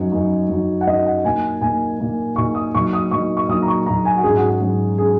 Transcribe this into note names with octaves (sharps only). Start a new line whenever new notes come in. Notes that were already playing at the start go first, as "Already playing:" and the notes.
Already playing: F#2 F#3 D#4 C#5
F#2 F#3 D#4
F#2 F#3 D#4
F#5
F#2 F#3 D#4 D#5
F#5
A#2 A#3 D#4 G#5
A#2 A#3 D#4 G#5
A#2 A#3 D#4
A#2 A#3 D#4 C#6
D#6
A#2 F#3 D#4 C#6
D#6
A#2 F#3 D#4 C#6
C#6
A#2 F#3 D#4 D#6
A#5
C#6
A#2 F#3 D#4 A#5
G#5
F#4
G#2 F#3 C#4 G#4
F#4
G#4
G#2 F#3 C#4
F#3 C#4 G#4